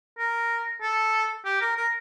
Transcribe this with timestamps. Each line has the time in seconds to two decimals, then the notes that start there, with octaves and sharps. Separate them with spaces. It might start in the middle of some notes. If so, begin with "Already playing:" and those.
0.18 A#4
0.82 A4
1.45 G4
1.61 A#4
1.76 A#4